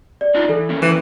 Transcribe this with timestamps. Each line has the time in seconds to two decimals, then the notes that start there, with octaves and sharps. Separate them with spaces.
0.21 D5
0.35 D4 D#4 F4
0.49 E3 A4
0.69 A#3 C#4 E4
0.82 E3